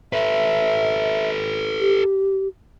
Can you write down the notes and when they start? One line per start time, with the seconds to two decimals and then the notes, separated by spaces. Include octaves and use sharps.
0.13 A4 B4 E5
1.80 G4